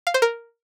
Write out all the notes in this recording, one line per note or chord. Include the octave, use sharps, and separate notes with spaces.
F5
C5
A#4